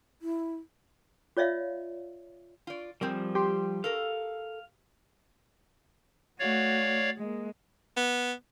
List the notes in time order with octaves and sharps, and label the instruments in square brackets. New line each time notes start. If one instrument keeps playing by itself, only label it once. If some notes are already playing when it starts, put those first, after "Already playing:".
[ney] E4
[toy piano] F4 C#5 D5 E5 F5
[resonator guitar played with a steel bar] F4 D5
[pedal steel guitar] F3 G3 [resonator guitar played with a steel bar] C4 G#4 A#4
[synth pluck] G4 C6
[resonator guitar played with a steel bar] A4 A#4 [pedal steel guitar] F5
[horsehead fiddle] A3 F#4 [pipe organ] C#5 D5 F5
[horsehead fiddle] G#3 A#3
[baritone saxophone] B3